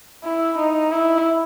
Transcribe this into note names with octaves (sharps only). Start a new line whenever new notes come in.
E4
D#4
E4